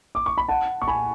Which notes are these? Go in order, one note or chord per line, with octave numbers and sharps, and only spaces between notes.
D6
C#6
B5
F#5 A5
C#6
G#5 B5